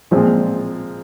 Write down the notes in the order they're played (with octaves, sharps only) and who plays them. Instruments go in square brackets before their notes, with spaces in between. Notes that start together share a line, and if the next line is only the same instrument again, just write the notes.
[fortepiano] A#2 F3 G#3 C4